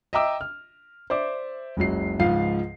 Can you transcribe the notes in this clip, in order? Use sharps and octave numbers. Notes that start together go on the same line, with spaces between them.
D#5 E5 G5 A#5 D6 E6
F6
C5 D5 E5 D6
F#1 C#2 F#3 C7
C#2 G#2 F3 F5 C7